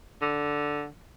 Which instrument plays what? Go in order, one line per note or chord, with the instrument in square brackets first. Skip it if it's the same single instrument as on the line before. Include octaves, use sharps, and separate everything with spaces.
[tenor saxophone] D3